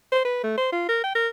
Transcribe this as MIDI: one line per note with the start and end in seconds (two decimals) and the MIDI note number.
0.12 0.21 72
0.25 0.39 71
0.43 0.55 57
0.57 0.69 72
0.72 0.86 65
0.89 1.01 70
1.04 1.13 79
1.15 1.28 70